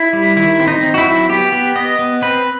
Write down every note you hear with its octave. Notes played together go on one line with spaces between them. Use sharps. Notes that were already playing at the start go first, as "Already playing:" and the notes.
Already playing: E4
G3
D#3 E4
C4
D#4
C4
F#4
E4
F#3
B3 G4
B3
B3 D#5
B3
C4 B4